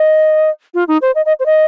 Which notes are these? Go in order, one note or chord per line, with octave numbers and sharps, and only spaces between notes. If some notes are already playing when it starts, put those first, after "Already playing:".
Already playing: D#5
F4
D#4
C5
D#5
D#5
C5
D#5